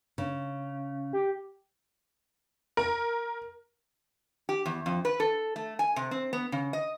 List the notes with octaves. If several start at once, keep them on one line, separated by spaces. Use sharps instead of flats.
C#3
G4
A#4
G4
E2
F2
B4
A4
A3
G#5
C3
C4
B3
C#3
D#5